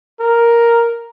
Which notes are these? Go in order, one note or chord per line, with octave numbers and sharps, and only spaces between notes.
A#4